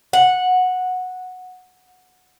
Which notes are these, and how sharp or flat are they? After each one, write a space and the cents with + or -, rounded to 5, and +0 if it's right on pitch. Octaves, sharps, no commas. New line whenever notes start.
F#5 -10